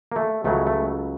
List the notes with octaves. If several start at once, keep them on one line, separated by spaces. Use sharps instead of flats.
A#3
A3
C#2 C#3 F#3 A3
A3